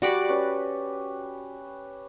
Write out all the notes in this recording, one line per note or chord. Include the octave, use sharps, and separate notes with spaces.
G3 F#4 G4 D5 B5
C#4 B4